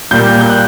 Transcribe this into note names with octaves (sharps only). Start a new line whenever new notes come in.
A#2 G3 A#3 G6
G6
F#6